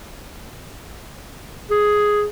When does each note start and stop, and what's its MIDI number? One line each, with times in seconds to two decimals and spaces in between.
1.70 2.26 68